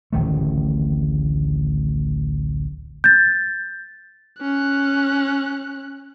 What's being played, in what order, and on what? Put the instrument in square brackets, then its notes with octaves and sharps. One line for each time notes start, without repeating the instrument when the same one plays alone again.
[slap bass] D1 A1 D#3 A3
[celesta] G6 A6
[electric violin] C#4 F#6